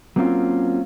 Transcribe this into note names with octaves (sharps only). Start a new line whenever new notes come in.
F#3 A#3 C4 C#4 F4